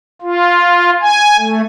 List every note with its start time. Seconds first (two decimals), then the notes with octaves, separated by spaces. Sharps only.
0.22 F4
1.01 G#5
1.37 A3